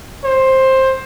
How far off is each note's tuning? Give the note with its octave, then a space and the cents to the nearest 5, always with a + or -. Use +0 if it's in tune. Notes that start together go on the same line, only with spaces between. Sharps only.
C5 +15